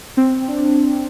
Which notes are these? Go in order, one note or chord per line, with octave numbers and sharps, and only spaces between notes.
C4
D4